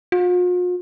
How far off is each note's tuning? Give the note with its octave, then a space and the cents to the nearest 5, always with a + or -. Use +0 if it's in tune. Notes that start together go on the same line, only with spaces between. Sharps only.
F4 +45